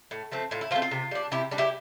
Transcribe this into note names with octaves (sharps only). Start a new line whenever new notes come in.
A2
F3 A3 C4
A2 F4
E4
F3 A3 C4 F4
F4
C3
G3 D4
C3 E4 G4
G3 D4
E4 G4